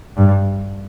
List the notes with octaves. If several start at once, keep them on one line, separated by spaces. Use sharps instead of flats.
G2